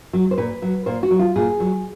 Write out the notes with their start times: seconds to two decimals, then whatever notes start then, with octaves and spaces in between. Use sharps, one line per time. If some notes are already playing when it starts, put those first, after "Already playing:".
0.13 F#3
0.31 C5
0.37 A#2 B4
0.62 F#3
0.86 A#2 C5
1.03 F#4
1.11 F#3
1.19 F4
1.36 A#2 G#4
1.60 F#3